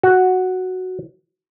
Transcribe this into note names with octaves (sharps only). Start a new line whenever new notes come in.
F#4